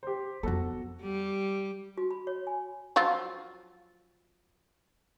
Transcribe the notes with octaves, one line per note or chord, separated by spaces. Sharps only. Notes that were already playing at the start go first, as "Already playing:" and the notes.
G4 C5
F2 B3 F#4 A4
G3
F#4
B5
C#5
G#5
F3 F#3 F4